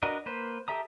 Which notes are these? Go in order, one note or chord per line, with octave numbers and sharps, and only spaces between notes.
D4 F#4 A#4 B4 D#5
A#3 B4 C5
G4 A4 E5 A#5 D#6